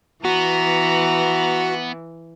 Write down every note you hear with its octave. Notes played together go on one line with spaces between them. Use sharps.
E3 B3 F#4 A#5